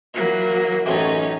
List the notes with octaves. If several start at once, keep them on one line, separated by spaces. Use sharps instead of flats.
E3 F#3 A#3
A1 F#2 A2 C#4 D#4